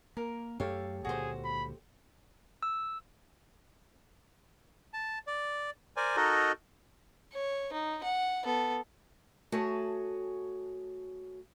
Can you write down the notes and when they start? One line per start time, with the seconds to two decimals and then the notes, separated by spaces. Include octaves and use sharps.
0.17 A#3 A#4
0.60 F#2 A3 G4 A4 C#5 F5
1.05 C#2 A#2 D3 F#4 G#4 C5
1.44 B5
2.63 E6
4.94 A5
5.27 D5
5.97 A#4 C5 D5 G#5
6.17 D#4 F#4 A4 A#4 D#5
7.33 C#5
7.72 D#4
8.04 F#5
8.44 B3 A4
9.52 A3 F#4 G#4 C#5 G#5 A5